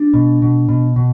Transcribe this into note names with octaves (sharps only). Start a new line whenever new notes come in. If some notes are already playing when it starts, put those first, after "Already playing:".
Already playing: D4
B2
B2
B2
B2